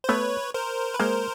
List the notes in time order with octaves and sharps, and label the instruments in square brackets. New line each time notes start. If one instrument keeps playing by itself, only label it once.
[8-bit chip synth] C5
[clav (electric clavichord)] A3 B3 [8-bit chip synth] B4 C#5
[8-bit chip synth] A#4 C5
B4
[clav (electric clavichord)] G#3 A#3 [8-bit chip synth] A#4 C5